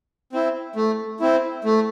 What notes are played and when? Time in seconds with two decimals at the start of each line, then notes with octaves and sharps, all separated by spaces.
0.33 C4 E4
0.76 A3
1.20 C4 E4
1.64 A3